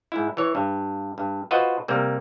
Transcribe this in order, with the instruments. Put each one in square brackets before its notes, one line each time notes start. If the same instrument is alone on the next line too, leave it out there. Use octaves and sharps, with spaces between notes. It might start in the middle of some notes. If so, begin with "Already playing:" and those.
[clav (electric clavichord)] G#2 E4
E3 C#5
G2
G2
F4 F#4 B4 C5 D#5
C3 G3 A#3